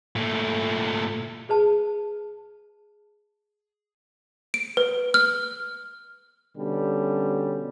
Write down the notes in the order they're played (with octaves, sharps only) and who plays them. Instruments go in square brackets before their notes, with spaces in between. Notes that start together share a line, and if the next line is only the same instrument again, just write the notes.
[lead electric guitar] A#2 A3
[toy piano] G#4 B4 A5
[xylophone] D7
B4
F6
[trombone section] B2 D3 G3 C#4